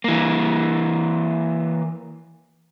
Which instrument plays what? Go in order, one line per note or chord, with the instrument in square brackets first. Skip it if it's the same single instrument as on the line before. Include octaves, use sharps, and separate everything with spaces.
[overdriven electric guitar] E3 A#3